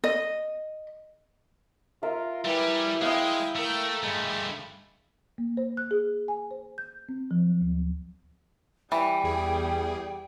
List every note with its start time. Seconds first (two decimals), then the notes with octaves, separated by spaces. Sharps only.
0.04 D#5
2.03 F4 A#4 E5
2.45 G3 E4 G4 B4 G#5
3.02 G#3 F5 G5 D#6
3.56 A3 A#4 G5
4.03 G2 G#3 A3 B5
5.38 A#3
5.57 C5
5.77 F#6
5.91 G#4
6.28 G#5
6.51 C5
6.78 G6
7.09 C4
7.31 F3
7.46 F#3
7.61 D2
8.92 E3 G3 G5
9.24 E2 G#4